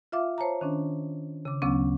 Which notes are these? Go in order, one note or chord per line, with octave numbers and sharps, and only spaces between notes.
F4 E5 F5 D6
C5 C#5 A5 A#5
D#3 C#4 D4
C#3 D6
D2 C#3 F#3 B3 C#4 D6